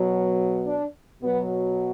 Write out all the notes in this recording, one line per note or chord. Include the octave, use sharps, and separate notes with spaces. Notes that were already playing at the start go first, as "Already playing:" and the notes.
Already playing: B2 F#3
D4
B2 F#3 B3